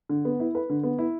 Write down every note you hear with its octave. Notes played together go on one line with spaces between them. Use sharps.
D3
B3
E4
B4
D3
B3
E4